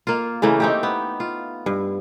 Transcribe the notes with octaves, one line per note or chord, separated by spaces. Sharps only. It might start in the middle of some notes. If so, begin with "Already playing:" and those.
A#3 F4
C#3 E3 A3 A#3
C4 D#4 G4
B3
F4
G2